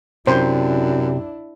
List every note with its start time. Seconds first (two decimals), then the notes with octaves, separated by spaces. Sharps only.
0.27 F#2 C3 D4 E4 C5